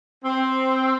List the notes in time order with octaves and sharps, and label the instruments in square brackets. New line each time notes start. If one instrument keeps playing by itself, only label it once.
[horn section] C4